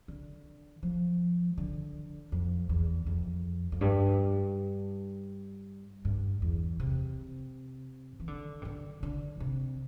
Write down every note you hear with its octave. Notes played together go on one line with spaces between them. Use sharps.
D3
F3
D3
F2
E2
F2
F2
G2
G2
E2
C3
E3
D3
C3
D3
D3
C3